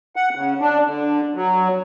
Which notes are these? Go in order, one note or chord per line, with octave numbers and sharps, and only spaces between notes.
F#5
C#3
D4
D3
F#3